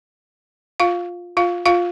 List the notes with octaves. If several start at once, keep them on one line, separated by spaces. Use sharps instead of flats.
F4 F5
F4 F5
F4 F5